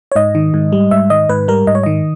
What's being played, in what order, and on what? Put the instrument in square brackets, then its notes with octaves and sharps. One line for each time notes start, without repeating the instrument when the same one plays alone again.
[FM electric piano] C#5
G#2 D#5
D#3
G#2
G3
G#2 E5
D#3 D#5
G#2 B4
G3 A#4
G#2 D#5
C#5
D#3 D#5